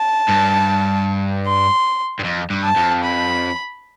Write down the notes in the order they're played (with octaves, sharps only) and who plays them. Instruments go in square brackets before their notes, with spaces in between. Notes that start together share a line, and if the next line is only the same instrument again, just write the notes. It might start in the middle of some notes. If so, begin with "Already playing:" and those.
Already playing: [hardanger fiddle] A5
[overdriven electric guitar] G2
[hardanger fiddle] C6
[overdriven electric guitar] G2
F2
G2
[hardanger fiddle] A5
[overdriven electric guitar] F2
[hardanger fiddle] B5